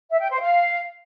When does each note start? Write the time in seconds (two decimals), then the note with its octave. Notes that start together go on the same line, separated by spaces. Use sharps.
0.11 E5
0.21 G5
0.31 C5
0.41 F5